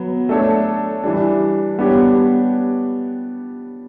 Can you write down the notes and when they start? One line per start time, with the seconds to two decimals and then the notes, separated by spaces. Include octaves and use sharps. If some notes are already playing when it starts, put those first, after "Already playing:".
Already playing: F#3 B3
0.29 A3 D4 A4 C#5
1.04 E3 G3 D4
1.78 G3 B3 D4 G4 C#5